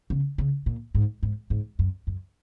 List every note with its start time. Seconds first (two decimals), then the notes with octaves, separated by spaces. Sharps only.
0.10 C#3
0.38 C#3
0.66 A#2
0.95 G#2
1.23 G#2
1.50 G#2
1.79 F#2
2.07 F#2